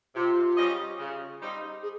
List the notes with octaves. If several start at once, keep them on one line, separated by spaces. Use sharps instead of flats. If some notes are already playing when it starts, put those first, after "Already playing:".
C3 F4
G3 C#4 G#4 D#5
C#3
G3 C4 D#4
G#4